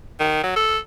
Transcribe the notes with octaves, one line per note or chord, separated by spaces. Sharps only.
D#3
F#3
A4